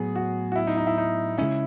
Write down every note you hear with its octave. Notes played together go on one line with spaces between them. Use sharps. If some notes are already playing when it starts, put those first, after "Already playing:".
Already playing: A2 F#3 B3 G#4
F#4
F#4
E4
D#4
D#4
E4
D#4
C#3 G#3 C#4 E4